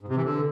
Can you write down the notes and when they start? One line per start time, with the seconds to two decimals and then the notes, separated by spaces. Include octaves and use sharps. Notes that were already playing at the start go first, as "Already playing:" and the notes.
0.01 G#2
0.08 C3
0.16 E3
0.23 D3